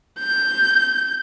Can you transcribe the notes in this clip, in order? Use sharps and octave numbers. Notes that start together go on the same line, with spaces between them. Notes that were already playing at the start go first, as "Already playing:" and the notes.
G6